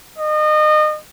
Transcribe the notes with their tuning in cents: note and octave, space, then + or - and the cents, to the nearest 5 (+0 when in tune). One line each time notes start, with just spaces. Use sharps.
D#5 -30